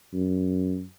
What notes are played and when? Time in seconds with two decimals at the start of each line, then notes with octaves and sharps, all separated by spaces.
0.13 F#2